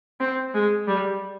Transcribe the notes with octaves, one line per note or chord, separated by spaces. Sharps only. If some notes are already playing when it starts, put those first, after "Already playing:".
C4
G#3
G3